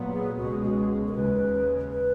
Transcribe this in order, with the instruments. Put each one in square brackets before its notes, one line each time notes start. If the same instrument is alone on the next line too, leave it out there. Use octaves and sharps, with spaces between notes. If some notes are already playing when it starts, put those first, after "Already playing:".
Already playing: [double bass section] A#2 F#3 B3
[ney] G#4
[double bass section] C#2 B2 G#3 [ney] F#4
[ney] F#4
A#4
[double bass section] D#2 C#3 G#3 [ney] B4
[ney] B4